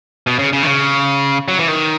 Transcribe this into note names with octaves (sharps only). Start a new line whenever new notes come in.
B2
C#3
C#3
D#3
C#3
F#3
E3
D#3